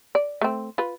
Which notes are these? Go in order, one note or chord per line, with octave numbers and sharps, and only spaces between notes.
D5
A3 C4
F4 B4